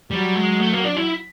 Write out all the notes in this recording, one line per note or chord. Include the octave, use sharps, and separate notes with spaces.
F#3 G3
G#3
A3
A#3
D4
E4